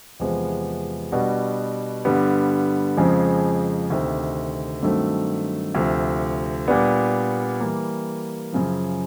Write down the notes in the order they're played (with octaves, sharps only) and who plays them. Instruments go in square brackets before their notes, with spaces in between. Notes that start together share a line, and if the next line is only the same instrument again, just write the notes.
[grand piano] E2 C3 F3 G#3 B3
B2 G3 B3 D4 F#4
G2 D3 G3 B3
F2 C#3 F3 G#3
D2 C3 D#3
G2 D#3 F#3 A3 C4
D2 C3 F3
A#2 G3 B3 D4
E3 G3 A#3
F#2 C#3 F3